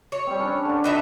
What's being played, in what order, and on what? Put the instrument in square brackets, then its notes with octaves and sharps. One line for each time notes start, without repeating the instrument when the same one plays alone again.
[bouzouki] C#5
[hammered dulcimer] G3 C4
C#4 D4
D3 D4
[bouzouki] B3 D#4 E5